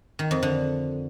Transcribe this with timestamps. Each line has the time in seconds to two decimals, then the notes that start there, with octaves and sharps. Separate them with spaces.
0.19 D#3
0.31 F2
0.43 D3